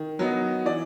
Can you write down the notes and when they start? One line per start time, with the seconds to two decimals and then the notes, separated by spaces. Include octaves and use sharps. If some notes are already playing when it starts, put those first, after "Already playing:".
Already playing: D#3
0.19 F#3 B3 D#4
0.65 E3 D5